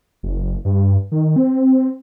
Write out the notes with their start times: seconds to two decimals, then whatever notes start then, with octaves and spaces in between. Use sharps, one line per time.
0.23 F#1
0.65 G2
1.12 D#3
1.36 C4